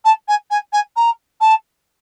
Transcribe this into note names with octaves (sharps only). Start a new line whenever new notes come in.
A5
G#5
G#5
G#5
A#5
A5